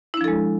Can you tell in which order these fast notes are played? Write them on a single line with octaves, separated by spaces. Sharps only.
E4 D4 F3 A4 G#3